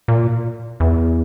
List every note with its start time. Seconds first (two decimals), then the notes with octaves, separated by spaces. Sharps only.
0.08 A#2
0.80 E2